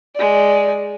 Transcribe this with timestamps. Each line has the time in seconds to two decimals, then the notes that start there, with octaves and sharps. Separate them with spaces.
0.15 G#3 D5